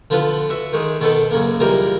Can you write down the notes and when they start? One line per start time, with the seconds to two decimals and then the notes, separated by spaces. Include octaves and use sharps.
0.10 D3 F3 B3 F4 B4
0.49 F#4 E5
0.73 D#3 G#3 D#6
1.01 B2 D#3 B3 A4 B4
1.31 F#2 C#3 A#3
1.60 C#2 E3 G3 A#4